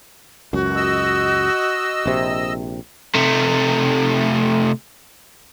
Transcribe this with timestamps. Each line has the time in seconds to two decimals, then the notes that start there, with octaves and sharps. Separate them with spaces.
0.53 C#2 F#2 F#4
0.76 D#5 E6
2.06 A#1 C3
3.15 C3 A3